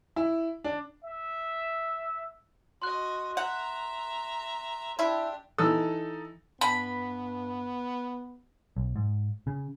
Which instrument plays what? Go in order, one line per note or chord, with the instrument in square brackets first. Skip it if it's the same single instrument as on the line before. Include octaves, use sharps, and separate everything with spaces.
[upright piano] E4
D4
[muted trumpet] E5
[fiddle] F#4 D#5 [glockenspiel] C6 F#6
[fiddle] E5 A#5 [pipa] F#5
[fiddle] D4 G4 [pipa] E4 E5
[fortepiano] E3 E6 [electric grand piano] D#4 A4
[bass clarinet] G2 [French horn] B3 [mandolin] B5
[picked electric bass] B1
G#2
C#3